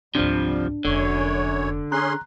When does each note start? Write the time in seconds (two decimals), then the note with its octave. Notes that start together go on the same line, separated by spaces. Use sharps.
0.15 G#1 C#2 C3 E3 F3 G3 D4
0.85 F1 F#2 D3 C#5
1.92 C#4 G#4 A#5 C6 F#6